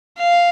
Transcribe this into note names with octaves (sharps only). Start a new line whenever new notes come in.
F5